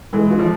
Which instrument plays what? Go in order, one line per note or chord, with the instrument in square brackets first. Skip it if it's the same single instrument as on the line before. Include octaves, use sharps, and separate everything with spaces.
[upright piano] E3 [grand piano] G#3
[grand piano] F4
[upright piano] F3